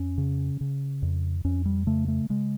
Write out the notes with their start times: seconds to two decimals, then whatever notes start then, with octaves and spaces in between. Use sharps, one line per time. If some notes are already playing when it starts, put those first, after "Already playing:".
Already playing: F2 C#4
0.18 C#3
0.61 C#3
1.02 F2
1.45 F2 C#4
1.66 G3
1.87 C#3 A3
2.08 A3
2.30 C#3 G#3